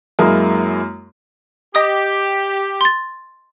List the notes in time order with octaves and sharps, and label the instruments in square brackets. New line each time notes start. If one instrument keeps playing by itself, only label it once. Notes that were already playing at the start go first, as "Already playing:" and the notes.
[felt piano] F#2 G#3 A#3 E4
[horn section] G4 [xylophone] D#5 D#6
[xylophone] C6 A6